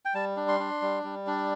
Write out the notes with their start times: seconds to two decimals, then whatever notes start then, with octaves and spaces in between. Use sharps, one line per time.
0.05 G5
0.14 G3 A5
0.37 D4
0.48 C6
0.60 D4
0.82 G3
1.04 G3
1.27 D4